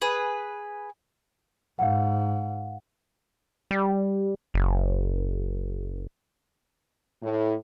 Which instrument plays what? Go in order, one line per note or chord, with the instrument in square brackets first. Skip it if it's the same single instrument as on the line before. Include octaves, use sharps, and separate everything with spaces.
[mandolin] G#4 B4
[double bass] G#2 [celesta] F5 F#5
[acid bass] G3
F#1
[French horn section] A2